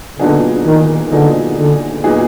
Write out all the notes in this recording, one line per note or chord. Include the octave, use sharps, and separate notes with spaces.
A#2 D3 F#3 B3 D#4 G#4
D#3
A#2 D3 F#3 B3 D#4 G#4
D3
A#2 F#3 B3 D#4 G#4